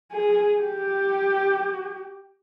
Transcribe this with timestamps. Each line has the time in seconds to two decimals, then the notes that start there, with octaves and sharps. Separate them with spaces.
0.12 G#4
0.61 G4